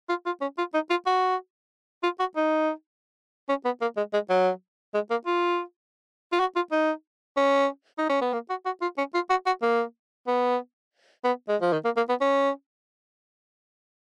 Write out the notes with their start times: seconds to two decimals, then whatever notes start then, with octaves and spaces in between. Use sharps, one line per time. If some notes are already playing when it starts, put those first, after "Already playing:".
0.09 F4
0.26 F4
0.41 C#4
0.58 F4
0.74 D#4
0.90 F4
1.07 F#4
2.03 F4
2.20 F#4
2.36 D#4
3.49 C#4
3.65 B3
3.82 A#3
3.97 G#3
4.14 G#3
4.30 F#3
4.94 G#3
5.11 A#3
5.27 F4
6.33 F4
6.40 F#4
6.56 F4
6.72 D#4
7.37 C#4
7.99 D#4
8.10 C#4
8.22 B3
8.33 A#3
8.50 F#4
8.66 F#4
8.82 F4
8.98 C#4
9.14 F4
9.30 F#4
9.46 F#4
9.62 A#3
10.27 B3
11.25 B3
11.49 G#3
11.62 F3
11.73 D#3
11.85 A#3
11.97 A#3
12.09 B3
12.21 C#4